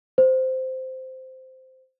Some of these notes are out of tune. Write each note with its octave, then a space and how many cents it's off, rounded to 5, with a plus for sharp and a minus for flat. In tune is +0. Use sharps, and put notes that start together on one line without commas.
C5 -10